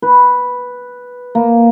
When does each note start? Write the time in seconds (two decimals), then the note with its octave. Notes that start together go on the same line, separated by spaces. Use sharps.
0.02 B4
1.35 A#3